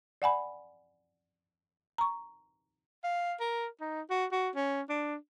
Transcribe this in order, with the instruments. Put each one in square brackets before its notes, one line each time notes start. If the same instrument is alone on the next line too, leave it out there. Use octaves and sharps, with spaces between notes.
[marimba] D5 F#5 G#5 B5
A#5 C#6
[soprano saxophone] F5
A#4
D#4
F#4
F#4
C#4
D4